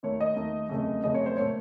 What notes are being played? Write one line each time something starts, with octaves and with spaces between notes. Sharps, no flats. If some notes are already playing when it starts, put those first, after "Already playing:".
D#2 D#3 A3 C#5
D#5
D#2 D#3 A3
F#1 F2 C#3 A3
F#1 F2 C#3 A3 D#5
C#5
C5
A#2 A3 C#5